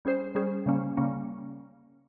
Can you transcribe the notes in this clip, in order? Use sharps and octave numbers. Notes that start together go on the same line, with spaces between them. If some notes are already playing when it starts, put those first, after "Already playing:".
G3 C#4 G#4 C5
G3 C#4 G#4 C5
C#3 G3 A#3 C#4
C#3 G3 A#3 C#4